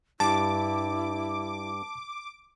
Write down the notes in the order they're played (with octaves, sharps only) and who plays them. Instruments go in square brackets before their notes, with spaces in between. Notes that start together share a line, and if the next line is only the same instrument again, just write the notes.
[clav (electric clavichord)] G2 [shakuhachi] E4 [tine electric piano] A5 [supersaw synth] D6